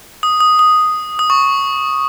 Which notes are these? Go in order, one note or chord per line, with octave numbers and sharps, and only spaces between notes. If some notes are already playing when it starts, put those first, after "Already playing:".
D#6
D#6
D#6
D#6
C#6